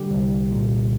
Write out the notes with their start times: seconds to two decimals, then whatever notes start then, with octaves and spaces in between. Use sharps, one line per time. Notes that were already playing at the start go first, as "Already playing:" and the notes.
Already playing: D3 G3 G4
0.11 C2
0.51 A#2